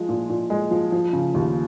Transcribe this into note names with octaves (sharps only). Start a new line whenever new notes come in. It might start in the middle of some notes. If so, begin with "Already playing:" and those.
Already playing: F3 G#3
A#2
A#2
G#3
F3
F3
C#3
D#2